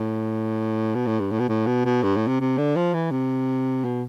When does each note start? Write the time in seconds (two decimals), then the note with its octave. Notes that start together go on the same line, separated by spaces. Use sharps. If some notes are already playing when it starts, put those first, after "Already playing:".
Already playing: A2
0.95 B2
1.07 A2
1.20 G2
1.31 A2
1.40 B2
1.49 A2
1.67 B2
1.85 B2
2.03 G2
2.16 A2
2.28 C3
2.40 C3
2.58 D3
2.77 F3
2.94 E3
3.11 C3
3.85 B2